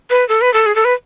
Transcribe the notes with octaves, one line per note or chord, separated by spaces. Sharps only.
B4
A4
B4
A4
G#4
A4
B4